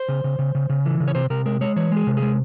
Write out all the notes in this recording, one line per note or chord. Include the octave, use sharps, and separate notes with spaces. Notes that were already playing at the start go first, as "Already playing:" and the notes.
Already playing: C5
C#3
C#3
C#3
C#3
C#3
E3
C#3
C#5
C3 C5
C3 A#4
G#3 A#4
G#3 C#5
E3 C#5
G#3 G#4
C3
G#4
G#3